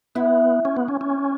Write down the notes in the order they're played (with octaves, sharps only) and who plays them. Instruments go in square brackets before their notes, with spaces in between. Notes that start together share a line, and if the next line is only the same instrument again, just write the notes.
[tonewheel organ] B3 [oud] E4
[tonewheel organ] C#4
B3
C#4
C#4